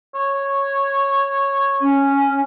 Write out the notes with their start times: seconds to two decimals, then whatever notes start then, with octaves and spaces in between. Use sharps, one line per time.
0.15 C#5
1.81 C#4